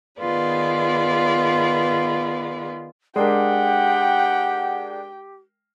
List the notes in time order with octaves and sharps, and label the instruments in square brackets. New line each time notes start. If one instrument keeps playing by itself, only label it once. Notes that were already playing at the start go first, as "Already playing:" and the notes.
[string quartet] D#3 B3 F4 G#4 B4 D5
[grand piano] G#3 D4 A#4 [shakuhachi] G4 [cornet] F#5 [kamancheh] G5